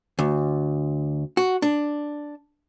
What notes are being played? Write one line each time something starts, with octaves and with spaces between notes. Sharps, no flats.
D2
F#4
D4